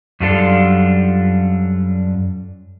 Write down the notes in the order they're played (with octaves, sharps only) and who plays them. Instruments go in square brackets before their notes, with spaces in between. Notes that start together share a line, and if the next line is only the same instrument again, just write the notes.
[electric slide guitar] F#2 G3 D4 F4 A4